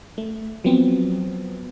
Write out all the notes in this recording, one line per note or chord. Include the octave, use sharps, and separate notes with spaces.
A3
F3 F#3 B3 C4